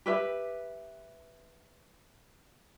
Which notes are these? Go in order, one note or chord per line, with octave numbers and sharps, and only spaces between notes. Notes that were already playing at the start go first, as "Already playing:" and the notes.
G4 B4 E5